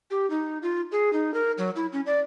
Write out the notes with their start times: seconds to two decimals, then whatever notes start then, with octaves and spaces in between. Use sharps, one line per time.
0.11 G4
0.30 D#4
0.62 F4
0.92 G#4
1.13 D#4
1.34 A#4
1.58 F#3
1.76 E4
1.93 C#4
2.06 D5